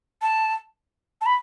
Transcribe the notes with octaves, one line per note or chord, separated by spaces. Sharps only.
A5
A5
B5